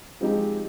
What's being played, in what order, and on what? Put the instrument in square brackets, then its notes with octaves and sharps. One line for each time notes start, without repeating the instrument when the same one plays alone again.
[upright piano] F3 C4 D#4 G4 [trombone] G#3